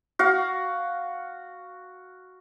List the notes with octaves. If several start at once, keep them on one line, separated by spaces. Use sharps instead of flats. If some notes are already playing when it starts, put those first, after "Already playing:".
F#4 F5